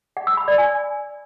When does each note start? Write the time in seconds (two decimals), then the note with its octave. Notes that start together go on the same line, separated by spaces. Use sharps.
0.17 F#5
0.27 E6
0.37 B5
0.48 D5
0.58 G#5